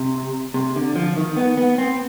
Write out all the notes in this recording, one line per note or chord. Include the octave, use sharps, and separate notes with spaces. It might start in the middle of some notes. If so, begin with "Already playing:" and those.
Already playing: C3
C3
D3
F3
D#3
B3
B3
C4